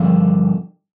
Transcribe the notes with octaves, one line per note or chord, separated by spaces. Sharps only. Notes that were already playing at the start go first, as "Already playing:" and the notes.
Already playing: G2 D3 F3